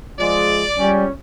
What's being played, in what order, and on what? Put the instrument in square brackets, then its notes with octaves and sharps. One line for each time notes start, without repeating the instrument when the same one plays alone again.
[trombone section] F3 G#3 [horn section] D5
[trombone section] C#2 C#4 [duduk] G3